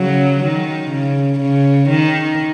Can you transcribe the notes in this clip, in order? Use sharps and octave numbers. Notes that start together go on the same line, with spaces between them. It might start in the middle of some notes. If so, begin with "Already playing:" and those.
Already playing: C#3 F#3
D#3
C#3
C#3
D#3